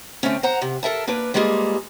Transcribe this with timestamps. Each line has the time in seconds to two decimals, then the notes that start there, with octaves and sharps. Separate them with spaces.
0.23 D3 A3 C4 C#4
0.43 C5 F#5 A#5
0.62 C3
0.83 A4 A#4 E5 A5
1.07 A#3 D4 A#4 B4
1.34 G3 G#3 A#3 F4 G#4